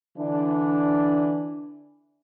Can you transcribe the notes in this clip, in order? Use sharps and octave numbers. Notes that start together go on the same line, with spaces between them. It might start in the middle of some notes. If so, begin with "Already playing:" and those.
D3 E3 D4